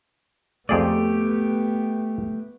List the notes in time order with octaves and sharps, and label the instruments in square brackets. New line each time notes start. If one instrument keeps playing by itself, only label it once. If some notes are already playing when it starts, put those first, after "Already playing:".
[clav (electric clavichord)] F2 G#4 D5 [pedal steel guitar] A3 G4 [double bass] B3